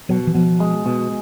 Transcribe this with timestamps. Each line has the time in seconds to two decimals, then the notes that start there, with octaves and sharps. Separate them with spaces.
0.09 B2 F#3
0.27 E3
0.35 B2 F3
0.60 G#3
0.86 B2